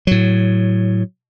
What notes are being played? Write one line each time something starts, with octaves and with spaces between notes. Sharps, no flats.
A2 F#3